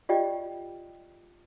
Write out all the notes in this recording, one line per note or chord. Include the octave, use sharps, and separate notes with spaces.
F4 G4 D5 D#5 G5